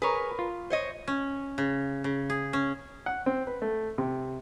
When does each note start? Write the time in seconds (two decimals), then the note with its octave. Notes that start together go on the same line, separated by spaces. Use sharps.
0.02 G#4 A#4 B4 C#5
0.39 F4
0.70 C5 C#5 D#5
1.08 C#4
1.58 C#3
2.04 C#3
2.30 G#4
2.53 C#4
3.06 F#5
3.26 C4
3.47 B4
3.62 A3
3.98 C3